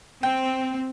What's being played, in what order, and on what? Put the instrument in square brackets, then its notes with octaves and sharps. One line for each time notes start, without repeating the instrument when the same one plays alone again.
[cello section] C4 [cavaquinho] G5